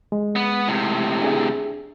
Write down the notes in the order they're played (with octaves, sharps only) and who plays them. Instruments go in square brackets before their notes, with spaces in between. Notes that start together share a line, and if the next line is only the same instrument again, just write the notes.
[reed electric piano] G#3
[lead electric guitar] B3
A2 C3
[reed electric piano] D4 G#4 E5